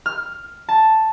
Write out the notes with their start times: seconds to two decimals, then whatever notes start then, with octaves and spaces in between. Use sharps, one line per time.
0.06 F6
0.69 A5